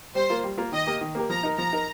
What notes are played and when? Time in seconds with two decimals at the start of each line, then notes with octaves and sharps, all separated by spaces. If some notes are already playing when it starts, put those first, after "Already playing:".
0.15 G3 C5
0.30 A#3 F4 A#4
0.44 G3
0.58 A#3 F4 A#4
0.72 D#3 D#5
0.87 A#3 G4 A#4
1.01 D#3
1.15 A#3 G4 A#4
1.30 F3 A#5
1.43 D#4 A#4
1.58 F3 A#5
1.73 D#4 A#4